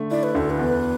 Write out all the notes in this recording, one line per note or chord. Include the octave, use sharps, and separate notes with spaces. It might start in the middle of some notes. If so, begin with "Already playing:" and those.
Already playing: D3 A3
E4 D5
B4
D2 A4
B4
E2